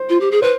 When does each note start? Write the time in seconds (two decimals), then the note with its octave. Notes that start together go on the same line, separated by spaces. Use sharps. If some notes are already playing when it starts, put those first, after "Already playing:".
Already playing: C5
0.09 F4
0.21 G4
0.31 G#4
0.42 B4 C5